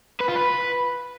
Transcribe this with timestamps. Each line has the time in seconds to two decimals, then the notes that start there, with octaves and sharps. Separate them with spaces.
0.21 B4
0.28 F4
0.36 B4